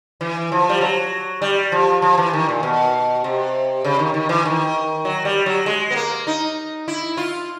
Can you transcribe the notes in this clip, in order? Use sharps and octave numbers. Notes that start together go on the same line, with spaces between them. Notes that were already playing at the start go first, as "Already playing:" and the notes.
E3
F3
G3
F#3
G3
F3
F3
E3
D#3
A#2
B2
C3
C#3
D#3
D#3
E3
D#3
F#3
G3
F#3
G#3
B3
A#3
D#4
E4
F4